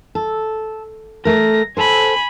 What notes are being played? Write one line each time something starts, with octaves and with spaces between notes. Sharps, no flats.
A4
A3 A#4 A#6
A4 C5 G#5 B5